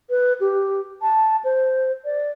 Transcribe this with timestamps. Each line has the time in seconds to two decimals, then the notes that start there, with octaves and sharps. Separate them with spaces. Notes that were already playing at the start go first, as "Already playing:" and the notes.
0.10 B4
0.40 G4
1.02 A5
1.44 C5
2.05 D5